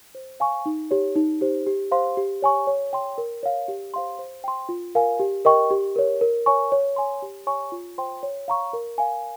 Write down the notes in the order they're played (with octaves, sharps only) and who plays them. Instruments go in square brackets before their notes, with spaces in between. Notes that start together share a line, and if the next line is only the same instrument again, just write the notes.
[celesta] C5
F5 G#5 C#6
D#4
G4 C#5
D#4
G4 C5
G4
C5 F5 C6
G4
C#5 G#5 C#6
C#5
G5 C6
A#4
C#5 F5
G4
C5 F5 C6
C5
G5 C6
F4
A#4 F5 G#5
G4
A#4 D#5 G5 C#6
G4
A#4 C#5
A#4
C#5 G#5 C#6
C#5
G#5 C6
G4
C#5 G#5 C#6
F4
C5 G5 C6
C#5
F5 A#5 C#6
A#4
F5 G#5